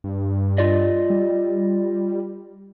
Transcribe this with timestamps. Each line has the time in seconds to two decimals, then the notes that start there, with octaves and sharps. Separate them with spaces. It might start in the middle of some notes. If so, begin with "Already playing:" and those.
0.04 G2
0.58 F4 D5 D#5
1.10 G3